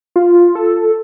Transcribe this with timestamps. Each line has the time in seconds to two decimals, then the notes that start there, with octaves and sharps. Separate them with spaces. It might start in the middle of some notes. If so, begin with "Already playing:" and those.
0.16 F4
0.55 A4